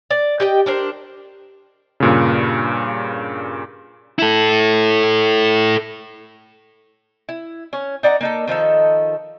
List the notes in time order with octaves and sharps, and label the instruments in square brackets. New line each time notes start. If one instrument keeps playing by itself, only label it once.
[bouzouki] D5
G4 D#5 G5
D4 A#4 C5
[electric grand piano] G2 A#2 C#3
[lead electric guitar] E4 A4
[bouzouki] E4
C#4 C#5
D#4 D5 F#5 A#5
A#3 D#4 A4
D#3 F3 D#4 A4